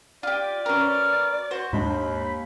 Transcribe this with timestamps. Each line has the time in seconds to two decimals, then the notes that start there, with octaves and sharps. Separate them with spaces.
0.23 F4 G4 D5
0.66 C#4 F#4 A#4 B4 F6
1.51 F#4 C5
1.73 D#2 G#2 G#3 D4 B5